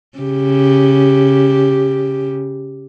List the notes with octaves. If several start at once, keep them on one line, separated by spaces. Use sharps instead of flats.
C#3 G4